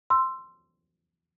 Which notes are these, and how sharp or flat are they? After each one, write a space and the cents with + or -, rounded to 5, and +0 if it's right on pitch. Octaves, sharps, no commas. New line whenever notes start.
C6 +0 E6 +15